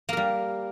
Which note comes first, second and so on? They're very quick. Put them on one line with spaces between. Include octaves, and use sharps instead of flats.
A#3 A#4 G3